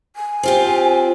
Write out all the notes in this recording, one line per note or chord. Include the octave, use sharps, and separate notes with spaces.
G#5
C4 F4 G4